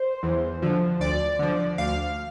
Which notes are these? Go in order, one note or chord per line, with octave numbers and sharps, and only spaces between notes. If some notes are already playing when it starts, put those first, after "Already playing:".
Already playing: C5
E2
D3 F3
D2 D5
D3 F3
D2 F5